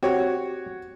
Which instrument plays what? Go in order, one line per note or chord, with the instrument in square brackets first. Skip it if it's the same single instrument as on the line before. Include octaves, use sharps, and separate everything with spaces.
[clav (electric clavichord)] C4 G4 [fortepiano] F#4 C#5